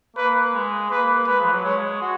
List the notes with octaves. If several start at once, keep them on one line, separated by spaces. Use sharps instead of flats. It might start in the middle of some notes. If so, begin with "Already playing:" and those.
A#3 B4
G#3
A#3 B4
G#3 B4
F3
G#3
F#3
G#3 C#5
F#4